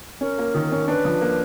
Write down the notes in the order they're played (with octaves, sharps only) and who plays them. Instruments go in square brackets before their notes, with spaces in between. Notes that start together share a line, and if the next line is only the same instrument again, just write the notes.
[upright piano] C#4 [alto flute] A#4
[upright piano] A#3
D#3
C#4
[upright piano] D4 [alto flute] B4
[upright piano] F3
A#3